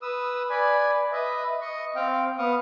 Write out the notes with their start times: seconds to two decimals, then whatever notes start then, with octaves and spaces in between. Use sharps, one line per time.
0.02 B4 D#6 E6
0.50 B4 D5 G#5 B5
1.12 B4 D#5 E5
1.61 D#5 C#6
1.96 C4 F5 G5
2.38 B3 F5 C#6 D#6